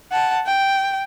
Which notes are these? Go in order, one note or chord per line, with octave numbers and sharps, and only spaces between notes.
F#5 A5
G5